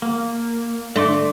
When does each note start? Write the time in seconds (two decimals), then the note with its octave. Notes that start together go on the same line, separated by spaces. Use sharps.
0.02 A#3
0.96 D3 A3 D5 C6 D6